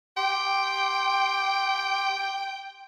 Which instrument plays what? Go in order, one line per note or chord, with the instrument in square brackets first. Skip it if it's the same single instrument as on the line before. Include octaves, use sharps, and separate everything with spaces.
[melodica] G4 C6 [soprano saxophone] G5